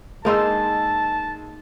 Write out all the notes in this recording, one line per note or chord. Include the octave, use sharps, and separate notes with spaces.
G#3 A#3 D#4 C5 A5 C6 E6